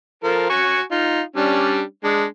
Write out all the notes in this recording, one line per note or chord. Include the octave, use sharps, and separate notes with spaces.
F3 A4 A#4
F#4 G#5 C#6
D#4 F4
G3 C#4 D4
G#3 D4